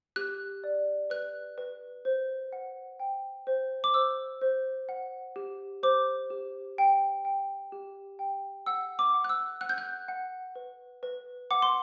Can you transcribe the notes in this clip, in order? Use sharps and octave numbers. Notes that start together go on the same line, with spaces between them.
G4 F#6
D5
B4 F#6
B4
C5
F#5
G5
C5
D6
C5 E6
C5
F#5
G4
C5 D6
G4
G5
G5
G4
G5
F#5 E6
D6
F#5
F#6
E6
F#5 F#6
G6
F#6
F#5
B4
B4
F#5 D6
C6